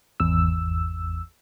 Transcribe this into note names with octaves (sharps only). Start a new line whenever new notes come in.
G#1 E2 E6